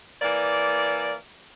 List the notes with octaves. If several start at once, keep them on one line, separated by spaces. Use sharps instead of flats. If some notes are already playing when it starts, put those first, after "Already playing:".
E3 A#3 D5